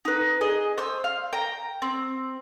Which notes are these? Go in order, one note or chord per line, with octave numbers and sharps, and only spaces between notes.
D#4 B4
G#4 D#5
C5 D#6 E6
F5
G5 A#5
C4